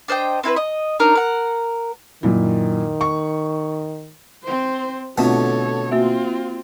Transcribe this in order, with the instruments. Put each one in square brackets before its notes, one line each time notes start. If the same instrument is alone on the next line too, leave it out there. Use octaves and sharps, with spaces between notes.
[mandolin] D4 C5 D#5 G5
C4 E4 A#4 B4
D#5
D4 D#4 A#4 C#5
A#4 F#5
[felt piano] F#2 A#2 E4 [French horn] D#3
[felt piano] C#6
[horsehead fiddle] C4 C5
[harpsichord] B2 D3 A3 [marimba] C4 F4 [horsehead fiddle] A4 C#5
[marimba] A#3 F#4 E5 [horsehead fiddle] C4 F4